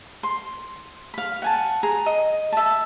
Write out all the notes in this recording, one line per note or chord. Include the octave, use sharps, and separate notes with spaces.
C6
F5 B5
F#5 G#5 A5
G#4 A#5
D#5
E5 A5